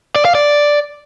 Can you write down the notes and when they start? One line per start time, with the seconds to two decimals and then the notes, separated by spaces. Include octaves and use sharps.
0.16 D5
0.25 F5
0.35 D5